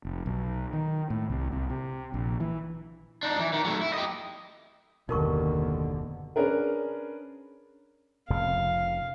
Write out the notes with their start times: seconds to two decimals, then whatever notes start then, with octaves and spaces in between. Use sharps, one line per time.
0.05 F1
0.26 B1
0.73 D#3
1.10 A2
1.30 C2
1.52 C2
1.70 C3
2.14 A#1
2.40 E3
3.23 D4 D#4
3.39 E3
3.53 D#3
3.65 F#3 A3
3.81 E4
3.94 G4 D#5
5.09 F#1 D#2 B2 D3 D#4 A#4 C#6
6.36 C#4 D4 G#4 A#4 B4
8.30 F1 F2 C#3 F5